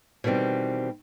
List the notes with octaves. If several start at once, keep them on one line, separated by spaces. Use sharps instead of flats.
B2 D#3 E3 G3 C4